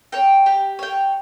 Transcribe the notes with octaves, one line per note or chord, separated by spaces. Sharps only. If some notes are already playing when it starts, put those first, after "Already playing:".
C#5 G5
G4
C#5 G5